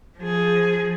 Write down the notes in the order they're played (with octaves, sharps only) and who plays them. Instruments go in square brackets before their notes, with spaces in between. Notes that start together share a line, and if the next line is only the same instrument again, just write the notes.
[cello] F3 G#4